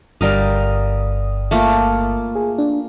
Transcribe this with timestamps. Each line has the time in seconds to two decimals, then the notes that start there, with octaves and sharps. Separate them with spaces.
0.21 G1 G2 G3 A#4 F5 D#6
1.51 A3 A#3 F4
2.35 G#4
2.58 D4